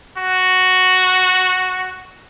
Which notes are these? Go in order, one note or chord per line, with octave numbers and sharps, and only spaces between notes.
F#4